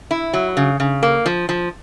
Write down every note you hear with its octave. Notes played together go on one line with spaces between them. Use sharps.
E4
F#3
C#3
C#3
A#3
F3
F3